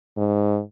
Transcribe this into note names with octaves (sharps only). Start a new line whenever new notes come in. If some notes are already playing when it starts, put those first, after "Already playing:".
G#2